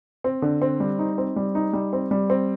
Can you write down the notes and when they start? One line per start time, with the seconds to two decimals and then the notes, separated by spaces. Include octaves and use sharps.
0.24 C4
0.42 D3
0.62 C4
0.80 G3
0.99 D#4
1.18 C4
1.36 G3
1.55 D#4
1.73 G3
1.93 C4
2.11 G3
2.30 C4